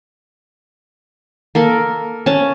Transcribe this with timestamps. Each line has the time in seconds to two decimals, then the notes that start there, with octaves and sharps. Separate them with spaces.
1.55 A#3 A4 A#4
2.26 C#4 A5